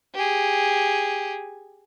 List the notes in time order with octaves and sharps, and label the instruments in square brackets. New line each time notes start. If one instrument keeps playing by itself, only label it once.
[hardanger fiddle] G4 G#4